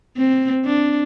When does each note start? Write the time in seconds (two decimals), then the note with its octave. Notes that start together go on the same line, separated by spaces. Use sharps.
0.17 C4
0.65 D4